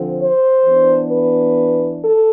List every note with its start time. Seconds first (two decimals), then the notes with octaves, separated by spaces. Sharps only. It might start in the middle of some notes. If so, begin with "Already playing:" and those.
Already playing: D3 F3 C4
0.20 C5
0.65 E3 B3 D4
1.11 B4
2.02 A4